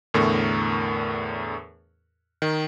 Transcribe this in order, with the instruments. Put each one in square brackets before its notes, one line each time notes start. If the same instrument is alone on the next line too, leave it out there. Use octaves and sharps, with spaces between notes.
[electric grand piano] E2 A2 D3 A#4 C#6
D#3